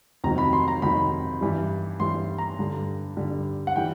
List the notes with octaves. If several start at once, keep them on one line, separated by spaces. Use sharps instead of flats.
F2 C3 D#3 F#3 A#5
B5
C6
A#5
F2 C3 D#3 F#3 B5
G2 E3 G3
G2 E3 G3 C6
A#5
G2 D3 G3
G2 D3 G3
F#5
E3 G3 G5